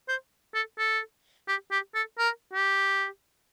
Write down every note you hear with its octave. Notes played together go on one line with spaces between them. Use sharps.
C5
A4
A4
G4
G4
A4
A#4
G4